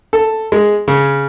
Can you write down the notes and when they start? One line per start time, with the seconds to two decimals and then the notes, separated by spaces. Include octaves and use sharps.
0.13 A4
0.52 G#3
0.88 C#3